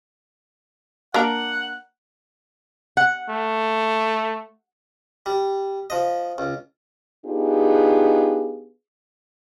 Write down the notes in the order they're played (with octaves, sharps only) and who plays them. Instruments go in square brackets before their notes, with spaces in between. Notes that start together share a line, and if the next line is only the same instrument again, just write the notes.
[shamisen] A#3 D4 A#4 [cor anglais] F#5
[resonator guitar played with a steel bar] F#5
[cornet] A3
[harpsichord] G3
F3 D#5
C#2
[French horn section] B3 D4 D#4 F4 G4 G#4